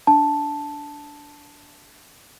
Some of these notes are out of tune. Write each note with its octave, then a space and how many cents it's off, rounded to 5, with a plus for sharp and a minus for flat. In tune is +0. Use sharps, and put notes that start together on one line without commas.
D4 -15 A5 +0